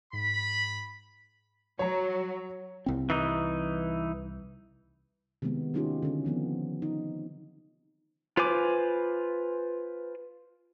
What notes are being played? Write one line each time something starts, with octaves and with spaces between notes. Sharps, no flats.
G#2 B5
F#3 C#5 A#5
C2 C4
E3 D#4
C3 D#3 F#3 G#3 B3
F#3 A#3 C#4 D#4 F4 G4
D3 C#4
D#3 F3 B3 C4
D#4
F4 B4 C5 G#5 D6